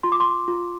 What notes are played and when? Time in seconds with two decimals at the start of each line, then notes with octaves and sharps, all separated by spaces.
0.03 F4 C6
0.12 D6
0.20 C6
0.48 F4